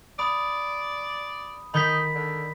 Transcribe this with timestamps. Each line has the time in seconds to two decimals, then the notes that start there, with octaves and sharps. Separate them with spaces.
0.19 D5 B5 D#6
1.74 D#3 D#4 B5 G6 B6
2.15 D3